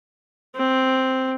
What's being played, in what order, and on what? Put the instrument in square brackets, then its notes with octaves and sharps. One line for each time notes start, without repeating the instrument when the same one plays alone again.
[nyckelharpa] C4